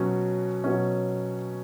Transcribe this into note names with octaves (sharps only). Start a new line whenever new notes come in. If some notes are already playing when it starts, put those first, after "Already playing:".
Already playing: B2 F#3 C#4
B2 F#3 C#4